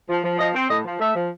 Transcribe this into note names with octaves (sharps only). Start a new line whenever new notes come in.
F3
F3
F3 D#5
C4
A2 D#5
F3
A3 E5
F3